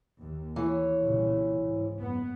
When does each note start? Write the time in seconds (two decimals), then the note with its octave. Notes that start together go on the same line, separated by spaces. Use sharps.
0.20 D#2
0.56 E3 C#5
1.04 C2 A#2 C#3
1.65 G#2
2.00 F#1 B3